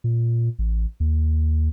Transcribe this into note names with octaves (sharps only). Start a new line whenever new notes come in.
A#2
A1
D#2